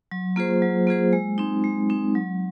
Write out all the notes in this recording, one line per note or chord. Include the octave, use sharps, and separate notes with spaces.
F#3
A#3 F4 G#4 C5
F#3
A#3 F4 G#4 C5
G#3
C4 D#4
G#3
C4 D#4
F#3